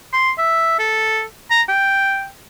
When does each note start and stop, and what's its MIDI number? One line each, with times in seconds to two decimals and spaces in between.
0.13 0.31 84
0.39 0.76 76
0.79 1.23 69
1.51 1.62 82
1.69 2.27 79